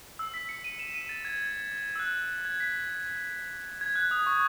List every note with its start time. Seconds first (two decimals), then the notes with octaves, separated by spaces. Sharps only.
0.19 E6
0.34 B6
0.49 C#7
0.64 D#7
0.79 E7
0.94 D#7
1.09 A6
1.25 G#6
1.95 E6
1.99 F#6
2.45 G#6
2.60 B6
3.81 G#6
3.96 F#6
4.11 D#6
4.27 C#6